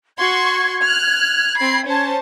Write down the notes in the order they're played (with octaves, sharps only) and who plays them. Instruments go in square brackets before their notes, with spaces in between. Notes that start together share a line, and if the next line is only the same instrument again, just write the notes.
[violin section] F#4 C6 C#6 [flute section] G#6
[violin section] F6 F#6
C4 B5 C7
C#4 C5 A5